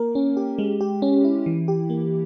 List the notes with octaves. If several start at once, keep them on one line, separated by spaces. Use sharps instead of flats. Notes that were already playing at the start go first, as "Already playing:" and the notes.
Already playing: A#3 A#4
C#4
G4
G#3
G4
C#4
E4
E3
G4
A#3